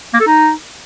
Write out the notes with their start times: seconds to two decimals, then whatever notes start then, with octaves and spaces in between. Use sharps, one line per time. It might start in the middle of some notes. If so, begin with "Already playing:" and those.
0.14 A#3
0.20 A4
0.27 D#4